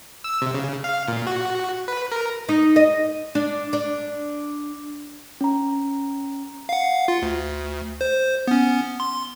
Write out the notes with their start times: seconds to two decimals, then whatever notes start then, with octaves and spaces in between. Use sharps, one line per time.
0.24 E6
0.42 C3
0.54 C#3
0.84 F5
1.08 A#2
1.27 F#4
1.88 B4
2.12 A#4
2.49 D#4
2.76 D#5
3.35 D4
3.73 D4
5.41 C#4 A#5
6.69 F5 F#5
7.08 F4
7.22 D2
8.01 C5
8.47 B3 C#4
9.00 C6